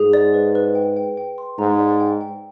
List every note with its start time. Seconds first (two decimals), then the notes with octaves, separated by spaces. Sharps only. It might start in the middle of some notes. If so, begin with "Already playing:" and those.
Already playing: G#2 G#4
0.13 D5
0.34 B4
0.55 B4
0.75 G5
0.97 G5
1.17 G5
1.38 C6
1.59 G#2 A#5
1.79 D5
2.00 G5
2.21 G5